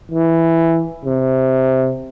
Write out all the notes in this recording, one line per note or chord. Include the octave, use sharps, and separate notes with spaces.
E3
C3